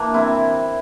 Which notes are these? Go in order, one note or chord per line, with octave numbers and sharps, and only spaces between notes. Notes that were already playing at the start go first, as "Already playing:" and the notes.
Already playing: E3 A#3 D4
C3 G3 C4 E4